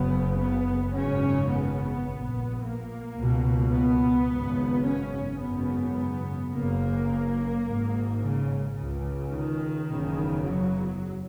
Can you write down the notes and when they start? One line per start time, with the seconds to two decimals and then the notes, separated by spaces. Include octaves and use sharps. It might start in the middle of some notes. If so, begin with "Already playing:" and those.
Already playing: F#1 F#2 C#3 B3
0.36 B3
0.93 G#1 F#2 C#3 C#4
1.49 B3
2.05 A#1 A#2
2.61 A#3
3.17 C#2 B2
3.72 B3
4.29 G#1 F#2 C#3
4.85 C#4
5.40 G#1 F#2 C#3 B3
6.51 F#1 F#2 C#3 A#3
7.65 G#1 G#2
8.20 C#3
8.76 C#2 C#3
9.31 D#3
9.88 F#1 E2 C#3
10.44 F#3